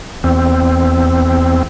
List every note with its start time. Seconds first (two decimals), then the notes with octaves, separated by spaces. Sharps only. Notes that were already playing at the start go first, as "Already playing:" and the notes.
0.24 E2 C4